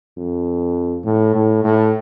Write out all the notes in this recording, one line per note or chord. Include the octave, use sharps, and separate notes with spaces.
F2
A2
A2
A2